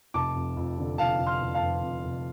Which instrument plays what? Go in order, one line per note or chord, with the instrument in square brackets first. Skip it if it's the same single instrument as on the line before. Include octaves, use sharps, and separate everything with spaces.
[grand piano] F1 A5 D6
F2
F2
D3
F1 F5 A5
F1
C6 F6
F1
F5 A5
F2
F2
F1